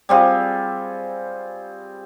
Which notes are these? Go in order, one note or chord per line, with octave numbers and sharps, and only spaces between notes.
G3 C4 F4 G#4